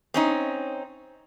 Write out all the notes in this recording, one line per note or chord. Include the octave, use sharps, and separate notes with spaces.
C4 C#4 D#4